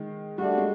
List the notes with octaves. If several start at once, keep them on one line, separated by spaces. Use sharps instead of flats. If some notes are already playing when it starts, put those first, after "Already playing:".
Already playing: D#3 G#3
G3 A3 D4 F#4
G#3